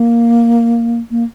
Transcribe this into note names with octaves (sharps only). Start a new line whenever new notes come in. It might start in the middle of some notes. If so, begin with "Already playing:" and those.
Already playing: A#3
A#3